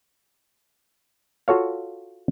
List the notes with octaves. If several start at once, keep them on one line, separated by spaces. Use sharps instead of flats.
F4 F#4 A4 C#5 F5